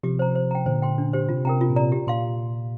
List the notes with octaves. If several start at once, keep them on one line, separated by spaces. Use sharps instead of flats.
C3 F3 G4
C5 A#5
C5
G5 A#5
A#2 D3 C5
G5 C6
D4
G4 C5
C3 F4
C3 A#4 G5 A#5
C3 F4
A#2
C3 D5 A#5
G4
A#2 F5 C6